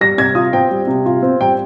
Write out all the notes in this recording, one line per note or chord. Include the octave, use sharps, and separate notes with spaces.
G3 A#6
C3 G#6
F4 D#6
C4 G5
G3
C3
F4
C4
G3 G5